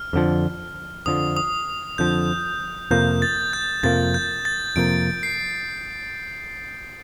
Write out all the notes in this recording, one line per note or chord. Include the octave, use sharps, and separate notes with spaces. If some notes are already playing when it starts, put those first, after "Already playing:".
Already playing: F6
F2 D3 F3
F2 D3 F3 D#6
D#6
F2 D3 F3 G6
F2 C3 F3 A#3 G6
A6
G6
F2 C3 F3 A#3 A6
G6
A6
F2 C3 F3 A#3 D7
C7